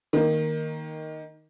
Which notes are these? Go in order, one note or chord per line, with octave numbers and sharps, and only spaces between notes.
D#3 A#3